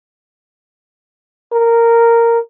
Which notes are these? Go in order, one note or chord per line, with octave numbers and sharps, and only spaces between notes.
A#4